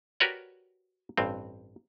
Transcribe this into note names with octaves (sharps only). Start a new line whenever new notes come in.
F#4 G4 A#4 B4 C#5 D5
A1 G2 C4